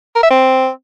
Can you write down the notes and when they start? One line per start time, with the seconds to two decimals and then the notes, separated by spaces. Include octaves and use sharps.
0.15 A#4
0.23 E5
0.30 C4